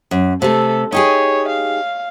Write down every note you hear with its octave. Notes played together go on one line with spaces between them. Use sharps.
F#2
C3 A3 A4
D#4 G4 G#4 C#5
F5